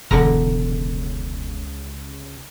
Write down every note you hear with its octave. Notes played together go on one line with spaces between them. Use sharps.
E1 C#2 D3 A#5